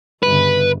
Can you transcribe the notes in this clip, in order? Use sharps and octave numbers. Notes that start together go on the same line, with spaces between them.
G1 C#3 B4